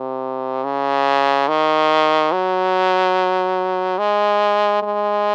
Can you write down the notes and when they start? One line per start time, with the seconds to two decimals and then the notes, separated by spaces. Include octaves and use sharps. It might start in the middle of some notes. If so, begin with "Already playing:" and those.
Already playing: C3
0.64 C#3
1.48 D#3
2.32 F#3
3.99 G#3
4.82 G#3